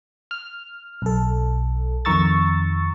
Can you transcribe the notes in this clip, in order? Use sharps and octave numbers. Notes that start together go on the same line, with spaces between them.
F6
B1 A4
F2 D#3 A#5 C#6 E6 A6